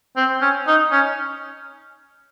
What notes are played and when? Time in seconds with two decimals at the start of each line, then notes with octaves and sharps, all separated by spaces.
0.17 C4
0.41 C#4
0.67 D#4
0.92 C#4